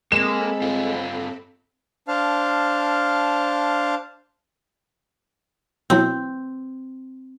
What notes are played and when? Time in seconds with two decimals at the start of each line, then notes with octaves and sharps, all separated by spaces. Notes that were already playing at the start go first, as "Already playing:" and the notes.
0.12 G#3 A#3 C4 A4 B5 E7
0.62 G2 F4
2.08 D4 C5 F5 A5 F6
5.90 B2 F#3 C4 E4